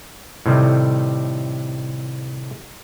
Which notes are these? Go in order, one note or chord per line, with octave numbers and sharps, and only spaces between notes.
A2 C3 D#3 G3 A3